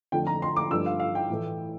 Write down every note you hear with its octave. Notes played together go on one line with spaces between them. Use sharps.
F2 D3 A3 D4 G5
A#5
C6
D6
G2 F3 A3 D4 E6
F5
F5
G5
A2 E3 A3